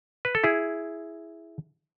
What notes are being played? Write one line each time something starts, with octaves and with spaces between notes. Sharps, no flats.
B4
A4
E4 G#4